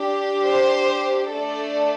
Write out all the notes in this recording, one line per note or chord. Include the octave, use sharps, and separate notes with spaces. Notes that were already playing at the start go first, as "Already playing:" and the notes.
Already playing: D4 G4
C5
A3 D4 A4 D5